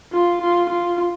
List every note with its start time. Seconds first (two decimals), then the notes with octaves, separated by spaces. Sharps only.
0.13 F4
0.42 F4
0.70 F4